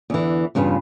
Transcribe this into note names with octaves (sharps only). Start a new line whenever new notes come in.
E2 D3 E3
E2 G2 C#3 F4 B4